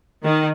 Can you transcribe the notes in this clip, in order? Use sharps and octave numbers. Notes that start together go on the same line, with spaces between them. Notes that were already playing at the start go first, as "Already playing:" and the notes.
D#3